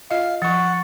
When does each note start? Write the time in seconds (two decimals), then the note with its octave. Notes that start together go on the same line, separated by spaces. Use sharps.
0.11 F4 D#5 F5
0.42 F3 F#5 C#6 A6